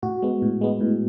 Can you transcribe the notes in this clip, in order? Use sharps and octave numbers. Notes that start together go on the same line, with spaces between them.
A2 F#4
G#3 B3
A2
G#3 B3
A2